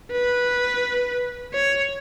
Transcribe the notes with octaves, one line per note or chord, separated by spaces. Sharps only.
B4
C#5